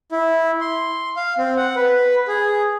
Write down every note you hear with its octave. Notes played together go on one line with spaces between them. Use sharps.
E4
C6
F5
C4
F#5
B4
G#4